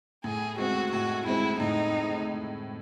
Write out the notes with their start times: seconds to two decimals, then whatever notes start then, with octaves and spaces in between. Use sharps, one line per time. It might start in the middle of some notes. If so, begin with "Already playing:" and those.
0.24 A2 G#4
0.58 G#3 C4 F#4
0.92 A2 F#4
1.26 G#3 C4 E4
1.60 A2 D#4